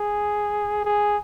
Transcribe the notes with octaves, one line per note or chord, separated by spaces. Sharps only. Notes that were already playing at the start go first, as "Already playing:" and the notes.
Already playing: G#4
G#4